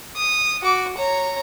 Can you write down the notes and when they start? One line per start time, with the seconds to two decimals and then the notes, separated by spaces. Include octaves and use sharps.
0.16 D#6
0.62 F#4 D6
0.97 C#5 A#5